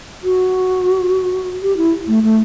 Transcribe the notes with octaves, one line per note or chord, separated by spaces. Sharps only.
F#4
G4
E4
A3
A3